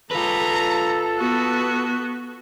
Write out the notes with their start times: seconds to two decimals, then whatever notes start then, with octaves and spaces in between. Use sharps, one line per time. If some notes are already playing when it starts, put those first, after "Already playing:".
0.11 F4 A4 B4 A#5
1.19 B3 F#4